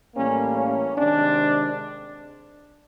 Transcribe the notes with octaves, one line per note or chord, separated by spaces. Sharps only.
A2 E3 G3 A#3 C#4
C#4
C3 D#3 G#3 C4 D4